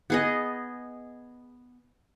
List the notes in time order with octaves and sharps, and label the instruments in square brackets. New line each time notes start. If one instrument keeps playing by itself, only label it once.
[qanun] B3 G#4 D#5